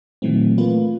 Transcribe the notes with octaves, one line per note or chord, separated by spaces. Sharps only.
A#2 D#3 E3 F#3 A3 C4
A3 A#3 F4 B4